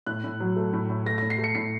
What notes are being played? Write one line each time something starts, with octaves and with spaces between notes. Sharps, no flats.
A2 F#6
A2
F#3
A3
A2
A2
A3 A#6
A#6
A2
C7
A3
C#7
A2 C7